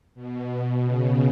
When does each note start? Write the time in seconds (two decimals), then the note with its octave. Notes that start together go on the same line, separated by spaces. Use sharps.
0.15 B2
0.85 C#3